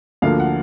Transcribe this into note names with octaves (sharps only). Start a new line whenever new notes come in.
D2 D3 F3 A#3 F5
F#5